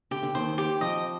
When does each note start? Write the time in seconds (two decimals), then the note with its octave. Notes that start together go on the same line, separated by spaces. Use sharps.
0.11 D3 G4
0.23 D3
0.35 D#2 D#3 C5
0.58 G4
0.81 F2 F3 D#5